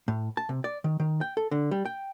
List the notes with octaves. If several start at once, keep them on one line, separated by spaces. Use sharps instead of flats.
A2
A5
C3
D5
D#3
D#3
G5
A4
D3
G3
G5